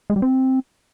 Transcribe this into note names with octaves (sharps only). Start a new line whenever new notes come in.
G#3
G3
C4